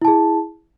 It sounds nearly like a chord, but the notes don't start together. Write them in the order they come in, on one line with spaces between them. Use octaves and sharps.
E4 A5 G#4